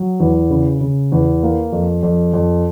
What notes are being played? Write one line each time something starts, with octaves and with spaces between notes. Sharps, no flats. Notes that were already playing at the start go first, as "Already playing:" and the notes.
Already playing: F#3
E2
C#3
C#3
E2
A#3
F2
F2
F2